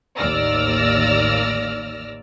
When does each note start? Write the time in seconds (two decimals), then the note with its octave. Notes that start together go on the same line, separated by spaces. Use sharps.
0.18 A1 D#2 D5 E6 F6 A#6